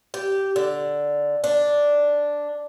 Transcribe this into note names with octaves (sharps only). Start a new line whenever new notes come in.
G4
D3
D4